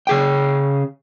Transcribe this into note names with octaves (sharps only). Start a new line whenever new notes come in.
C#3 G#4 G5